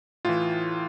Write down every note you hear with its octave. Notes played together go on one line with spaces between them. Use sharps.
A2 E3 F4